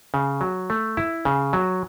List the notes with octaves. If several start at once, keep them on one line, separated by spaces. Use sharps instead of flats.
C#3
F#3
A3
E4
C#3
F#3